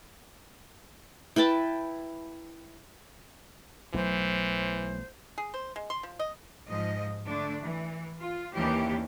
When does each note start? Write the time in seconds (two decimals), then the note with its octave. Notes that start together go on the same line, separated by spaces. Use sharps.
1.36 E4 B4 G5 A5
3.94 B1 E3 F#3 A3 C5
5.38 G#4
5.54 C5
5.76 G#3
5.90 C6
6.03 F3
6.19 D#5
6.68 G#2 F3 D#5
7.25 D3 A3 D4
7.62 E3
8.19 F4
8.54 D#2 E3 A#3 C#4 D4 G4